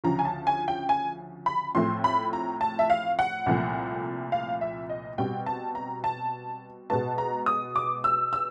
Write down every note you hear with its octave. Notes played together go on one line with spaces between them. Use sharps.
D2 C#3 F3 A#5
G#5
A5
G#5
G5
G#5
B5
A2 F3 A3 C4 C6
B5
A#5
A5
E5
F5
F#5
C2 A#2 F3 A3 C4
F5
E5
D#5
B2 G3 C4 G5
A5
A#5
A5
B2 G#3 B3 A5
A#5
D#6
D6
E6
E6